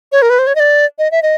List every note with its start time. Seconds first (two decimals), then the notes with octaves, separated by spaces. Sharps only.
0.12 C#5
0.22 A#4
0.30 B4
0.39 C5
0.47 C#5
0.55 D#5
0.60 D5
0.99 D#5
1.11 E5
1.22 D#5